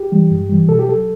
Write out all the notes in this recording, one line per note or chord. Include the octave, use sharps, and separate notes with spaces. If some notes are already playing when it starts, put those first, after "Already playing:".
Already playing: G4
E3 G3
G2
E3 G3
B2 A4
G4
F#3 A4